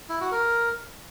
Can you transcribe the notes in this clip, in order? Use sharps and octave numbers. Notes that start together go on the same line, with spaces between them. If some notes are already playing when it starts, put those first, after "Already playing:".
E4
F#4
A#4